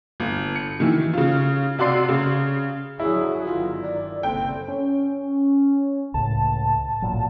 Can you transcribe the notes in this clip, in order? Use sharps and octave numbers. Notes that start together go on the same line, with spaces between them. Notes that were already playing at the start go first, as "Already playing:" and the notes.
G1
C#7
D#3 E3
C#3 F4
C3 F#4 D5 C6 C7
C#3
F#2 D3 F#3 E4 G#4
G1 D#3 F4
D5
F#1 C2 C4 A4 G5
C#4
C#2 A2 A5
A1 A#2 F#3